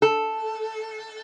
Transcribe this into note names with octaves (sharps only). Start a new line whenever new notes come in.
A4